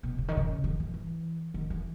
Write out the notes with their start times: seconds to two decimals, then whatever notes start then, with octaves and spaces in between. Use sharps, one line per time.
0.03 B2
0.18 C#3
0.28 D#3
0.37 C#3
0.64 D#3
0.80 E3
0.94 E3
1.54 D#3
1.70 E3